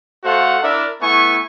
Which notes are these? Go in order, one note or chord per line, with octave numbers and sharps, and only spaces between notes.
A3 F#4 A4 C5 F5 F#5
D4 E4 A#4 D5 E5
A3 B3 E4 G#5 C#6